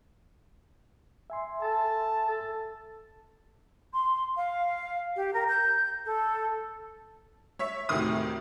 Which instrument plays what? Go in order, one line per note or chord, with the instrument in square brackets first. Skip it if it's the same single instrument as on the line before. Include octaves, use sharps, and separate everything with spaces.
[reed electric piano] E5 G#5 C6
[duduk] A4 [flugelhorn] A5
[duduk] A4
[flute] C6
F5
G4
A#4
G6
A4
[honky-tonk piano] C#5 E5 B6
D2 A2 C3 D#3 D#6